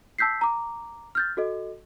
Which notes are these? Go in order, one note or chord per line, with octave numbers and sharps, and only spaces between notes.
A5 E6 G6 B6 C7
A#5 D6
F6 G6 A6
F#4 A4 D#5